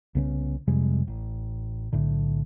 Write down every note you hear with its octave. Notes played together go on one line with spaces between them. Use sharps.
C2 C#3 B3 C#4
F2 C3 G3 G#3
A1
B1 A2 D3